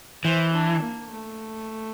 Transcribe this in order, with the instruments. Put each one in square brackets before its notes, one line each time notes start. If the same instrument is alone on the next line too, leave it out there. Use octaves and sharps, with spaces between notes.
[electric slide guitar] E3 [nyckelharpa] C5
[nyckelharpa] D4
A#3
A3